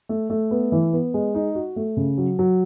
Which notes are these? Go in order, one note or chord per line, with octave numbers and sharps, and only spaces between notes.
A3
A3
B3
E3
B3
G#3
D#4
F#4
A3
C#3
F#3
F#3